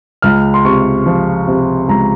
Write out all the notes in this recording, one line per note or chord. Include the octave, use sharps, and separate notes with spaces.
C#2 F6
C6
C3 C#6
F3
C3
C#2 A#5